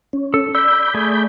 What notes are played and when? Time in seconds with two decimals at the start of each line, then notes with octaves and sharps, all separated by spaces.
0.13 C#4
0.34 A4
0.55 D5 B5 E6 G6
0.94 A3 G#4